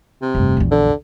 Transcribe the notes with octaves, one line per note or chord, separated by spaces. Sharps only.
C3
F1 G2
A#1 E2
D3